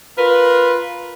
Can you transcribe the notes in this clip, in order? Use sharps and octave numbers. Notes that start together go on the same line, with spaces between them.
F4 A#4 B4